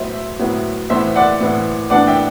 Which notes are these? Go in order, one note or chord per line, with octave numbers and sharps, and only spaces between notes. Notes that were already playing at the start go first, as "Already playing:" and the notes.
Already playing: A2 F#3 B3 E4 C5 E5
A2 F#3 B3 E4
A2 E3 B3 E4 C5 E5
D5 F#5
A2 E3 B3 E4
A2 E3 B3 D4 D5 F#5
E5 G5